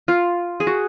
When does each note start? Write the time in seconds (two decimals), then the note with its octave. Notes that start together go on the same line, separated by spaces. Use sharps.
0.08 F4
0.60 G#4
0.67 F#4